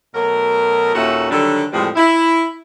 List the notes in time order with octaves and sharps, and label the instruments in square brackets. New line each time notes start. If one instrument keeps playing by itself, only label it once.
[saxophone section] B2 F#3 A3 A#4
D#2 A#2 C#4 F#4 A4 E5
D3 D#3 F#3 G3 D4 A4
F2 A2 E3 F3 G3 G#3
E4